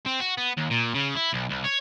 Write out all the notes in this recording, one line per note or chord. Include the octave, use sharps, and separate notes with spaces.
C4
F#4
B3
D#2
A#2
C#3
E4
B1
C2
C#5